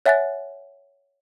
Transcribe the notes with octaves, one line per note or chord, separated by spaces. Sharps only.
C#5 E5 F#5 G#5 F#6 A6